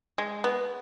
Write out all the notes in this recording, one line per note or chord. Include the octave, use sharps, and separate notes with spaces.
G#3
B3